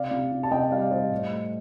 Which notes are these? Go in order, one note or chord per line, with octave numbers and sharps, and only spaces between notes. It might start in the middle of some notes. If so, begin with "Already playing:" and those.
Already playing: C3 D5 F5
C3
C3
A5
C3 D#5 G5
G3 D5 F5
G3 C5 D#5
A2
A3